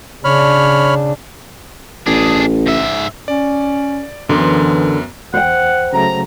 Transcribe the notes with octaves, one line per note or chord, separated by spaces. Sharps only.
C#3 D4 C#5 B5 F6
A1 D4 G#4
G#2 E5
C#4 D5
F#2 D3 E3 B3 A#4 C6
E2 C5 F#5 G5
C#3 F#3 A3 A#5